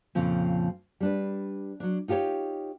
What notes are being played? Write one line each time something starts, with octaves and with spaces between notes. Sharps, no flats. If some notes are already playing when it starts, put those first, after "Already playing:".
F2 A#2 C#3 F3 C4
G3 D4 B4
F#3 D4
D#4 F4 G4 A4 C#5